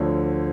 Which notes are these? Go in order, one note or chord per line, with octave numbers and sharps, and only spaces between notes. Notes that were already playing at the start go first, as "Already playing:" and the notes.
Already playing: D2 D3 F3 C#5